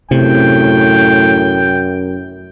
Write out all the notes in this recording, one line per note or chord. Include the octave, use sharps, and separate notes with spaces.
F#2 A2 C3 G5